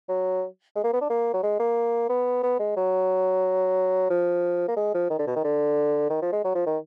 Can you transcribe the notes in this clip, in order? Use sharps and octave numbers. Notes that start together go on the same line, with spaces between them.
F#3
G#3
A#3
B3
D4
A#3
F#3
G#3
A#3
B3
B3
G#3
F#3
F3
A#3
G#3
F3
D#3
D3
B2
D#3
D3
D#3
F3
G#3
F#3
F3
D#3